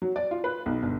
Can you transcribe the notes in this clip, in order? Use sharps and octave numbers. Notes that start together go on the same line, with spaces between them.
F#3
D5
F4
B4
B1
G1